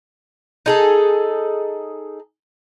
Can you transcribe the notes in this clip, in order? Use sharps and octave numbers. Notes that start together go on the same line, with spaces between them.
D#4 G#4 A4